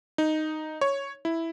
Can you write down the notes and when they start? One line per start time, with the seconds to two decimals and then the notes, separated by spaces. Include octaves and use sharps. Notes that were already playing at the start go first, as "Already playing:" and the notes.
0.18 D#4
0.81 C#5
1.25 E4